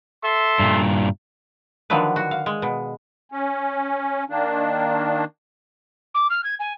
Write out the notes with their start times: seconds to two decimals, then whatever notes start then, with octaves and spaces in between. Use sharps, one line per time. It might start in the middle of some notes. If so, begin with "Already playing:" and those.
0.24 A4 E5 C6
0.59 G2 A#2
1.90 D3 D#3 F3 F#3 D4 B4
2.16 F#4
2.31 F5
2.46 G#3
2.62 B2
3.32 C#4
4.30 D#3 A#3 D4
6.15 D6
6.30 F6
6.44 G#6
6.60 G#5